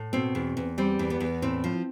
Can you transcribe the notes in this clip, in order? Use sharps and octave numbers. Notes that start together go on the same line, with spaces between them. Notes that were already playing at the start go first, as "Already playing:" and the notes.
Already playing: A2
B2 C4
E2
E2
G3 C4
E2
B3
E2
A2 C4
F3